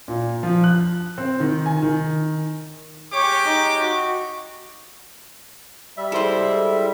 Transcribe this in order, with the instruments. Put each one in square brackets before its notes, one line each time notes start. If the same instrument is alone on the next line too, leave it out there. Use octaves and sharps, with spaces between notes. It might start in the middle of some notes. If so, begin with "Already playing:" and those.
[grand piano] A#2
F3
F#6
C4
D#3
G#5
D#3
[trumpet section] G#3 G4 D6 [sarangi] C#5
[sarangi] D#4
F#4
[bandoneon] G3 E5
[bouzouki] G#3 A4 [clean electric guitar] E4 C5